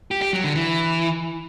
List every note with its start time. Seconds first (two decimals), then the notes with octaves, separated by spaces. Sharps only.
0.11 G4
0.22 G4
0.33 F#3
0.44 D3
0.55 E3